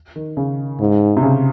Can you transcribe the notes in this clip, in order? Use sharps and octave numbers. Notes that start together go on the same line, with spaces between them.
D#3
C#3
G#2
C3
C#3